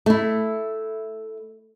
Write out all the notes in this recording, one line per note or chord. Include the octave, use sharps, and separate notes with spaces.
A3 E4